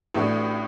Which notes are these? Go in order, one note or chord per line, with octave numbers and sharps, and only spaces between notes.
A1 A2 A3 D4 F#4